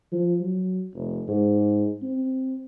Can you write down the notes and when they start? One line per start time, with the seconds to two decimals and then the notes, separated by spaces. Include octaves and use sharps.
0.12 F3
0.40 F#3
0.94 F1
1.28 G#2
2.02 C4